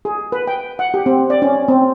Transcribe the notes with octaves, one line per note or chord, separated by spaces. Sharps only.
G#4
B4
G5
F#5
G4
C4
D5
C#4
C4